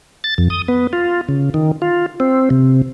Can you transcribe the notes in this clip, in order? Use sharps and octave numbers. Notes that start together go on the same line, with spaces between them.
A6
F2
D#6
B3
F4
C#3
D#3
F4
C4
C3